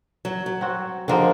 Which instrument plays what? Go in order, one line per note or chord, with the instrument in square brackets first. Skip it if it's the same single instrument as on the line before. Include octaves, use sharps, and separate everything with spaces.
[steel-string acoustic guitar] F#3
F#3
[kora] C4 F#4
[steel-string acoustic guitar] D3 F3 [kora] G#3 A#3 C4